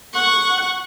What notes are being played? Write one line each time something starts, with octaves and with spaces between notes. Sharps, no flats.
F#5 C#6